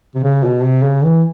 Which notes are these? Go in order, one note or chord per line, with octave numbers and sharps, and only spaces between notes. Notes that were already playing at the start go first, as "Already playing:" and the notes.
C3
C#3
B2
C3
C#3
E3